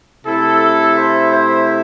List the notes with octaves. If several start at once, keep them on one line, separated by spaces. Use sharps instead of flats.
C3 A3 E4 A4
C5 E5
C5 E5